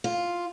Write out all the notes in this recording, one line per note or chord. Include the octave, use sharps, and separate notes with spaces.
F4